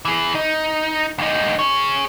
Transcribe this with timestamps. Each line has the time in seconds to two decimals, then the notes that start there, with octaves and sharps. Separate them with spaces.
0.05 E3 G#4
0.35 D#4
1.18 D2 D#4
1.59 G#4 C#5